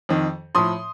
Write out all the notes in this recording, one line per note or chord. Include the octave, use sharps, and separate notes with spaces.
F2 D#3
A2 F3 C6 D#6